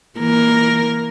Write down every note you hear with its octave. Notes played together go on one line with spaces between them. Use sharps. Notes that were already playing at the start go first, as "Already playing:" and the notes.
E3 A#3 A#4